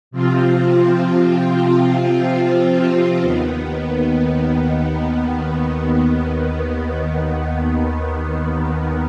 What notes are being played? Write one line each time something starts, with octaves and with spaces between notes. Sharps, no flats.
C3 F3 C4 F4
D#2 D#3 B3
D#2 D#3 B3